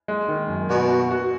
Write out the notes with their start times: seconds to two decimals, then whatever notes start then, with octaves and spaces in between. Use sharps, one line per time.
0.08 G#3
0.28 D#3
0.49 F#2
0.70 B2 F#4
0.90 F#4
1.11 F#4